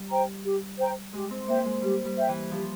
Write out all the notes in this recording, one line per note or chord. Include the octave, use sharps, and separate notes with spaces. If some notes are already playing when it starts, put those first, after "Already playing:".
Already playing: G3
C5 G5 A#5
G4
C5 G5 A#5
G#3 G4
C4
A#3 C5 E5 G5
G#3
G3 G4
G3
C5 E5 G5
E3
F3 G4